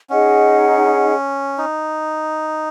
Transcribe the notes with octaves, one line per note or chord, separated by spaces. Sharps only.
C#4 D#4 G#4 D#5 F#5
D#4